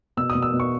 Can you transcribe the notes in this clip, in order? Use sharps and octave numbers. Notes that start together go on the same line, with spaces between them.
B2 E6
D#6
B2
E6
B2
C#6